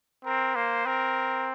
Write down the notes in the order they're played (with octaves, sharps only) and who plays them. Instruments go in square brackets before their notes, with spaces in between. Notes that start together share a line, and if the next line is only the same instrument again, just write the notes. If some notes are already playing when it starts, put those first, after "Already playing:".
[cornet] C4 [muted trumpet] A#4
[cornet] A#3 [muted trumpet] C5
[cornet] C4 [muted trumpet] A#4